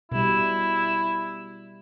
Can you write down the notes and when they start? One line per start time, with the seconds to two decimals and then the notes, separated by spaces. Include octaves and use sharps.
0.12 B2 G3 E4